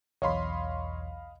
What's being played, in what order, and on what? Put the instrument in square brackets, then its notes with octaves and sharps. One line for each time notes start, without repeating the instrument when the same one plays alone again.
[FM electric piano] B1 E2 [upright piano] C#5 C6 [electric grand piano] D#5 F5 B5